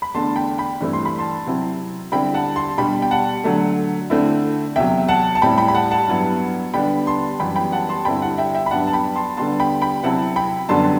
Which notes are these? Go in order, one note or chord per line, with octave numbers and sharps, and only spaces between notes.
B5
E2 D3 A3 D4 A5 C6
G5 B5
G5 B5
G2 E3 A3 C4 E4
C6
B5
A5 C6
C3 F#3 C4 E4
D3 G3 C4 E4 G5 B5
F#5 A5
A5 C6
B2 G3 D4 G5 B5
G5
F#5 A5
D3 F#3 A3
D3 A3 C4 E4
E2 C3 F#3 E5 G5
F#5 A5
A5
A2 G3 C4 E4 G5 B5
G5 B5
B5
F#5 A5
F#5 A5
G2 F#3 B3 E4
D3 G3 B3 D4 G5 B5
A5 C6
F#2 E3 G3 B3 G5 B5
G5 B5
F#5 A5
A5 C6
G2 D3 G3 C4 E4 G5 B5
F#5 A5
E5 G5
E5 G5
B5
G2 F#3 B3 D4 F#5 A5
A5
G5 B5
A5 C6
D3 G3 B3 A5 C6
G5 B5
G5 B5
C3 F#3 C4 E4 F#5 A5
G5 B5
F#2 D3 G3 B3 A5 C6